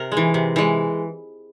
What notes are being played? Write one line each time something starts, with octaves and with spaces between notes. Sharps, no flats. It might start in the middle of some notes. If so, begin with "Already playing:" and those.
Already playing: C3 A#4
G#3
E3
C3
E3 G#3